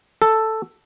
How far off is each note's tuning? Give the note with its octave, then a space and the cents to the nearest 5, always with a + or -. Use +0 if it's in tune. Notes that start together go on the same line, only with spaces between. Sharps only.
A4 +5